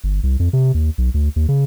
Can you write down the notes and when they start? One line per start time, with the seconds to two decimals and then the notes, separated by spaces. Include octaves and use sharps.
0.04 G1
0.23 C2
0.40 F2
0.53 C3
0.74 D#2
0.98 B1
1.14 D2
1.36 D#2
1.49 C#3